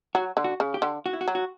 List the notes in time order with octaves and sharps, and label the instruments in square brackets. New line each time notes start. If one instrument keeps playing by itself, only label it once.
[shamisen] F#3 [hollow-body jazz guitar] F#4
[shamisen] D3
[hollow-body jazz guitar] F#4
[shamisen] C#3
[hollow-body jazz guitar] G4
[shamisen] D3
[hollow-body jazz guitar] F#4
E4
F#4
[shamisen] F#3
[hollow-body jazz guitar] F#4